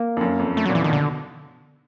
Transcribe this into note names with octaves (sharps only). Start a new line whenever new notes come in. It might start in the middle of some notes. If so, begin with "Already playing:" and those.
Already playing: A#3
F2
F#2
F2
A3
F#3
A#2
E3
B2 D#3
D3